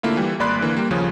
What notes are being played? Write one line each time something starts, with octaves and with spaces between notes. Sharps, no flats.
D3 A3 A#3 E4 F4
E3 G3
G#1 A#3 D5 B5 C6 F#6
D3 E3 A#3
G3 A#3
D#2 C#3 F3 C#4